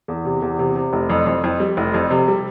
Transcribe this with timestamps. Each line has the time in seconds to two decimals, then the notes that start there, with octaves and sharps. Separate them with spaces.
0.08 E2
0.25 C3
0.42 E2
0.59 C3
0.76 C3
0.93 F1
1.10 F2
1.27 F2
1.44 F2
1.60 G3
1.77 F1
1.94 F2
2.11 C3
2.28 G3